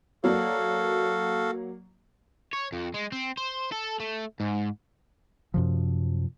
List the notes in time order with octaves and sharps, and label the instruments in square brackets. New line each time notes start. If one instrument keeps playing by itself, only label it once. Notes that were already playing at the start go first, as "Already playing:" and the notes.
[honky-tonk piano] F#3 A#3 D5 [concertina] F#4 A4 F5
[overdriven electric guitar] C#5
F2
G#3
C4
C5
A4
A3
G#2
[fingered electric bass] F#2 C3 F3